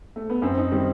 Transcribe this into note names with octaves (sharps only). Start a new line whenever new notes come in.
A3
B3
F#2 C4
D#4
D#3 G3 C4